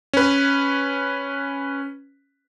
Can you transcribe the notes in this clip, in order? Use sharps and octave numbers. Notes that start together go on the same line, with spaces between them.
C#4 B4